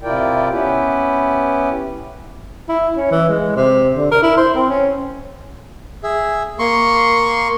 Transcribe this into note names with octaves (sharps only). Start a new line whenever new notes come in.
C3 E4 F4 A#4 D5 G5
B3 C#4 E4 G4 B4
E4
C#4
E3
G#3
C3
D3
A#4
E4
C5
C4
C#4
G#4 E5
A#3 C6 C#6